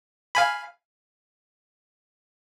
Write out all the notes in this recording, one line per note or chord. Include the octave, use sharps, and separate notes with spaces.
F5 G#5 B5